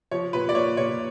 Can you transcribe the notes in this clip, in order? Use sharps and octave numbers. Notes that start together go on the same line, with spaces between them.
F3 C#5
A#2 B4
D5
A#3 C#5
A#2 C#5